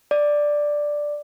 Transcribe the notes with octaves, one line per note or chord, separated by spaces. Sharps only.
D5